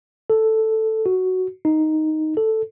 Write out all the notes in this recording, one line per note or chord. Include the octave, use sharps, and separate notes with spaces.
A4
F#4
D#4
A4